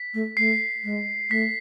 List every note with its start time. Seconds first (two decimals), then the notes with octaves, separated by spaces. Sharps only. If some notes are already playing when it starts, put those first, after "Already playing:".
Already playing: B6
0.14 A3
0.37 A3 C7
0.84 G#3
1.30 A3 B6